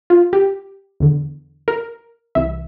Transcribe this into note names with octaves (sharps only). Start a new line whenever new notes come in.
F4
G4
E2 D3
A#4
C2 C3 E3 E5